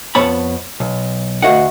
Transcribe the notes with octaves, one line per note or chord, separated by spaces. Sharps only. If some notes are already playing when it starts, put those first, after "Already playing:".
F2 B3 C#5 A5 B5
B1
D2 D#3 F#4 D#5 F5 F#5